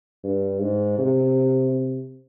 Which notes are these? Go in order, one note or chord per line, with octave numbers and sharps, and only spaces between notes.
G2
G#2
C3